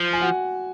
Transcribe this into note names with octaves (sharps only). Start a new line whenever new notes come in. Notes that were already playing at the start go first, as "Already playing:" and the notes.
Already playing: F3
G#5
F#4 F#5